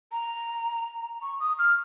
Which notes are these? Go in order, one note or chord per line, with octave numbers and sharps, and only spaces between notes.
A#5
C#6
D#6
F6